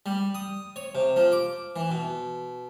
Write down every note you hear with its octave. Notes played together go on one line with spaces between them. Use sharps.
G3
D#6
C#5
C3
F3
D6
E3
B2